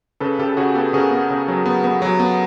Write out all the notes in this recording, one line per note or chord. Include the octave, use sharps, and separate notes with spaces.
C#3 A4 B4
C#3 G4 A4
A4
C#3 F#4 G#4
B3 G4 A4
C#3 G#4 A#4
B3
C#3
F#3
B3
B3
F#3
B3